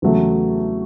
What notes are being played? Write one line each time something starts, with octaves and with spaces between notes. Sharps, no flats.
E2 C#3 F#3 A3